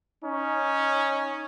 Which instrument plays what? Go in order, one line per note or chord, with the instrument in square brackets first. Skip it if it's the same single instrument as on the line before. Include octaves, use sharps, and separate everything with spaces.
[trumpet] C#4 [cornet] D#4